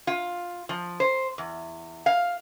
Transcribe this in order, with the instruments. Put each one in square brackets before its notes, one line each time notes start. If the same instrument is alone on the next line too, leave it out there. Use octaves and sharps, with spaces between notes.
[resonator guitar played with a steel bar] F4
F3
C5
E2
F5